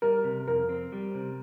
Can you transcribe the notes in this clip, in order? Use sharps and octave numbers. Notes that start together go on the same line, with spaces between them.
G3 A#4
C3
F2 A#4
C4
G3
C3